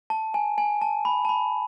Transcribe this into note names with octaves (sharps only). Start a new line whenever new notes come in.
A5
G#5
G#5
A5
B5
A5
B5